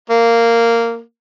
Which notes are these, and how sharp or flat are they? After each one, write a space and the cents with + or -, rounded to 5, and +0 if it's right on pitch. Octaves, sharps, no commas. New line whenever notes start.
A#3 -10